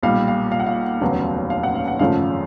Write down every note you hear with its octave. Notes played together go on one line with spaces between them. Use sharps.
B1 A#2 G3 F5
F5
F5
F#5
F5
F1 D#2 C#3 F#3 B3
F5
F#5
F5
F#5
G#1 F#2 C#3 F3 A3 F5